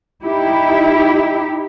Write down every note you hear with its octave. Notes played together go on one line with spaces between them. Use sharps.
D#4 E4 G4